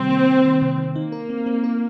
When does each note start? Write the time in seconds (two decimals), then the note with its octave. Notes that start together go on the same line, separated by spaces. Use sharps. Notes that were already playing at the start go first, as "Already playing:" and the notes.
Already playing: C3 D#3 G3 C4
0.10 A#3
0.27 A#3
0.45 D#3
0.62 C3
0.78 D#3
0.95 A#3 D#4
1.12 A#4
1.30 C4
1.46 C4
1.64 A#4